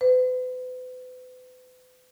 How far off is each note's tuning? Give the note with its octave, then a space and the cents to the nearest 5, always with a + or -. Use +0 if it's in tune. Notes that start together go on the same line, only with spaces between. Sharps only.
B4 +40